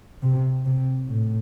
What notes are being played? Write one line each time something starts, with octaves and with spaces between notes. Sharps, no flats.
C3
C3
A2